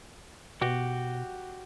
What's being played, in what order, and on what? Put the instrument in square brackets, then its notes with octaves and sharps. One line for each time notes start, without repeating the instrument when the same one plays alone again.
[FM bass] B2 [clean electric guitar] F#4 G4